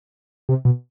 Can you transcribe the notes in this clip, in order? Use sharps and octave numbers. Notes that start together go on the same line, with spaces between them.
C3
B2